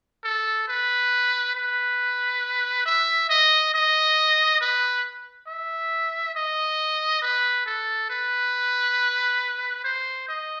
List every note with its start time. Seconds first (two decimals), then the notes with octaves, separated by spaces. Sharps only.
0.24 A4
0.68 B4
1.55 B4
2.86 E5
3.30 D#5
3.74 D#5
4.61 B4
5.47 E5
6.35 D#5
7.22 B4
7.66 A4
8.10 B4
9.84 C5
10.28 D#5